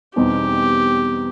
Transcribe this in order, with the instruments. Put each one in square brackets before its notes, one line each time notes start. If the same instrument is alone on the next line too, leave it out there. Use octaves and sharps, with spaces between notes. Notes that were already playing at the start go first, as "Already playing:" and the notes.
[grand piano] E2 B2 G3 C4 D#4 [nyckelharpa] G4